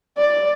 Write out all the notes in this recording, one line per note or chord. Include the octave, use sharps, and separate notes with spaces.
D5